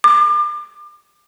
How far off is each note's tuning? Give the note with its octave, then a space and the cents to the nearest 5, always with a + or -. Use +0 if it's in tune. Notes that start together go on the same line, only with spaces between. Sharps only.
D6 +35